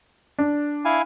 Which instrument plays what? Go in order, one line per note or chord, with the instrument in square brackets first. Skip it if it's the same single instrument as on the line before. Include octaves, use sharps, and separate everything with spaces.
[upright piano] D4
[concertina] E4 F5 G#5